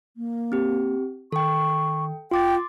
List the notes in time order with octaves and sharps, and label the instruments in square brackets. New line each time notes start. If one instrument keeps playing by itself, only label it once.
[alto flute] A#3
[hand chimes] C4 G4
[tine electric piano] D#3 [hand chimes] A4 G5 [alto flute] C#6
[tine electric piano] F4 [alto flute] G5 [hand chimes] C6 D6 A6